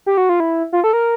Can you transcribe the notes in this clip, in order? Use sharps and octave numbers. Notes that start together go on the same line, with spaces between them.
G4
F#4
F4
E4
F4
A4
A#4